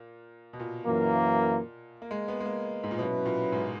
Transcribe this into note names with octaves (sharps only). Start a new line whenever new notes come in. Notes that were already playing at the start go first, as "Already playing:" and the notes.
Already playing: A#2
B2
A#2
F#2 E3 A#3
A#3
G#3
B3
G#3
A#3
G#2
A#2
B2 F#3 C#4 E4 B4
A#2
G#2